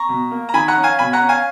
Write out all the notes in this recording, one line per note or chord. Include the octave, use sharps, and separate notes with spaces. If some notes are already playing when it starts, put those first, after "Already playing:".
Already playing: A#5 C#6
B2
A#3
A#5
D#3 G#5 B5
F#5 A#5
C#4
F5 G#5
B2 G#5 B5
F#5 A#5
C#4
F5 G#5